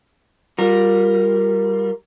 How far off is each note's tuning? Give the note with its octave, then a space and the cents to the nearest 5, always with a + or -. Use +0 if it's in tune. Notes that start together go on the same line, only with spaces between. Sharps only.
G3 +0 F4 +30 A#4 +0